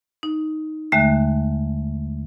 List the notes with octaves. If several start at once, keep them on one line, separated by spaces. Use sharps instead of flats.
D#4
D#2 D3 G#3 A3 E5